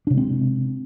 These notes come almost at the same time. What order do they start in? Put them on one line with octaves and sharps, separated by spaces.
D4 C3 G#3 C4